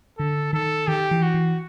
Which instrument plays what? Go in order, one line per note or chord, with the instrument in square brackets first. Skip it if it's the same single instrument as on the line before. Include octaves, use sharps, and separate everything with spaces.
[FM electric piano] D3 [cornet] A4
[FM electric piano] D#3 [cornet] A4
[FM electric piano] D#3 [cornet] G4
[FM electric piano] E3
[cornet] F#4
[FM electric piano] E3